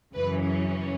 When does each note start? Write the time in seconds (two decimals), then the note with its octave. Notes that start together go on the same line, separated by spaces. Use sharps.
0.13 F#2 C#3 E3 B4
0.42 C#4